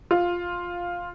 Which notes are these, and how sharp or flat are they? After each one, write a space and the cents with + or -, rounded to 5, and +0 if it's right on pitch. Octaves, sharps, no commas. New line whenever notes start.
F4 +5